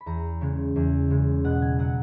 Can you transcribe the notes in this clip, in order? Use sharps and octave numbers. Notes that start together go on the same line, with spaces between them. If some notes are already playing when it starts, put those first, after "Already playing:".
B5
E2 A#5
C#3 G#3
E2
C#3 G#3
B2 F#5
G#5
F#3 F#5